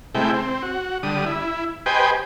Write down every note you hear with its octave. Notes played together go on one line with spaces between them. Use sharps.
C3 G#3 A3 E4 G5
C4
F#4
D3 G3 D#6
E4
G4 B4 C5 D#5 G5 G#5